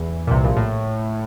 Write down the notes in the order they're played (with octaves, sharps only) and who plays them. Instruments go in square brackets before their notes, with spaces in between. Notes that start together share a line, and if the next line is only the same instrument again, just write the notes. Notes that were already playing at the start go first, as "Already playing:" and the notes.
Already playing: [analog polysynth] E2 E3
A#2
C2 C3
A#1 A#2
A2